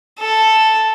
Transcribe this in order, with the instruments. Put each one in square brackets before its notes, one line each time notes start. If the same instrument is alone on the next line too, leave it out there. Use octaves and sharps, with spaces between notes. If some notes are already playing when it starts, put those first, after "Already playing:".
[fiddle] A4